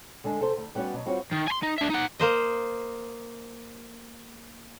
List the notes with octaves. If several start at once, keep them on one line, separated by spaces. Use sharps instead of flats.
D3 G#3 D4
C3 A4 C5
D2
G3 B3 C#4 F#4 D5
B2 F#3
G3 C4 F4 F#4 C#5
D#3
G#5 C6
D#4
D4 E5
D#4 F#5
A#3 C5 D#5